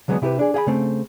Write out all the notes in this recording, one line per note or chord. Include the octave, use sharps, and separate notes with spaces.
D3 F#3 G#3 A3 B3
C3 E4 G4 G#4 B4
D4 G#4
G#4 F5 B5
C#3 A3 C4